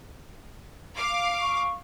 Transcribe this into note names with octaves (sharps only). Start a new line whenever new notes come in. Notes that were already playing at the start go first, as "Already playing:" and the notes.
F5 D6
C#6